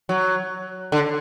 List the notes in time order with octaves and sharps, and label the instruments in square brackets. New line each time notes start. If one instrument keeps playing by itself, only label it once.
[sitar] F#3
D3